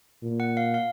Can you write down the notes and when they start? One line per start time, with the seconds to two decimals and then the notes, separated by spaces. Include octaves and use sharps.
0.23 A#2
0.40 F#5
0.57 F5
0.74 F5